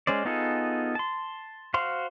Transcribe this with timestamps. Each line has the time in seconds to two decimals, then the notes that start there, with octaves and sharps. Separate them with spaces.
0.07 G#3 C#4 C5 D5
0.25 B3 D#4 F4 G#4 A4
0.95 A5 C6
1.74 F#4 C5 F5 C6